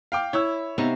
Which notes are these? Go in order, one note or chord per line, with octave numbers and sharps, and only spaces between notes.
F5 G5 D6
E4 C#5 E6
C3 B3 D#4 F5 C#6